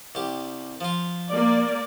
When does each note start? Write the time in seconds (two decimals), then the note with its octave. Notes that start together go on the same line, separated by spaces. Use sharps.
0.15 C2 G4
0.81 F3 F4
1.29 A#3 D5